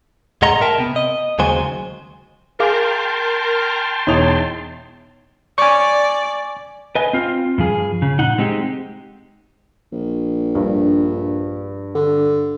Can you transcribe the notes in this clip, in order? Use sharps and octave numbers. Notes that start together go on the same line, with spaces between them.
G#2 G#3 D#5 F#5 A#5 C6
A#4 E5 G5 A5
C3 B3
D#5
D#2 C#3 F#3 G#3 C5 G#5
G#4 A#4 F5 G5 A5 C6 D6
E1 D#4 E4 C#5 D#6 F7
D5 G#5 C#6
B4 D#5 G#5
C4 F4
G2 F3 G#4
C#3
A#2 D#4 F#5
G#3 C4 D#4 G4
A#1
G2
D3